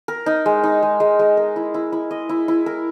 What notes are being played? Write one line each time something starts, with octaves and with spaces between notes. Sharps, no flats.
A#4
D#4
G#3
D#4
G#3
G#3
G#3
A#4
E4
E4
E4
D#5
E4
E4
A#4